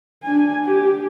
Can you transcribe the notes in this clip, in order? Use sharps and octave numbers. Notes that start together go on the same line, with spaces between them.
D4 G#5
G4